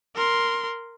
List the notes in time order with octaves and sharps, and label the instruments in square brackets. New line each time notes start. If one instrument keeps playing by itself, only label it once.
[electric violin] A#4 C6